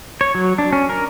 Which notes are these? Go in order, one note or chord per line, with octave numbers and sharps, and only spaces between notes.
C#5
F#3
D4
C#4
A#4